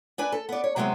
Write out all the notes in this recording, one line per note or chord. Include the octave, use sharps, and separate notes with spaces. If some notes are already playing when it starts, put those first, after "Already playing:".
D4 B4 G#5
A4
B3 D5
C#5
C3 F#3 G#3 B3 C4